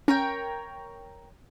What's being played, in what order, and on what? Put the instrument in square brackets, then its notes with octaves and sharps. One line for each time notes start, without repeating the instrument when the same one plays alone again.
[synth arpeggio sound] C#4 [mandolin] A#4 C#5 G5